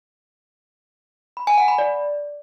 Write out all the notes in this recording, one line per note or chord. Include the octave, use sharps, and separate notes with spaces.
B5
G#5
F#5
B5
D5